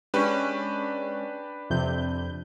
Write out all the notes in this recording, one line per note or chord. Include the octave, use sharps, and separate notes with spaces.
G#3 C#4 D4 G4 B4
F2 C3 G6